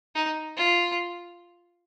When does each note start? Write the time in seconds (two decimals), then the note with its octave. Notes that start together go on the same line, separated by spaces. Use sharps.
0.15 D#4
0.57 F4